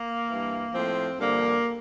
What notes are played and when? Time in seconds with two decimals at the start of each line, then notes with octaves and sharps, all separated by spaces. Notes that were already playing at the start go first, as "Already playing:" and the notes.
Already playing: A#3
0.27 G2 E3
0.74 A2 F3 C4
1.19 G2 D3 F3 A#3